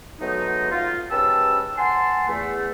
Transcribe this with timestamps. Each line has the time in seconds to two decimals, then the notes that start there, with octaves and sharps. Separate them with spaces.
0.21 F#3 G#3 A3 B3 D#4
0.72 F4
1.11 G#2 C#4 G4 B4 A5 E6
1.78 F#5 G#5 A5 C6
2.29 E2 A3